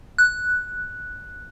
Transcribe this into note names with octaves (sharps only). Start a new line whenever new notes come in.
F#6